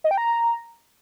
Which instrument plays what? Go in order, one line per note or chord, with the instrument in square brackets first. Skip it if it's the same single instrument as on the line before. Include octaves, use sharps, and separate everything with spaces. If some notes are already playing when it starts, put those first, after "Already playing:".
[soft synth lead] D#5
G5
A#5